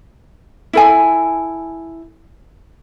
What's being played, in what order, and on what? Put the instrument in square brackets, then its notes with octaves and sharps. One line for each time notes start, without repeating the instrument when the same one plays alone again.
[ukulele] E4 A4 G#5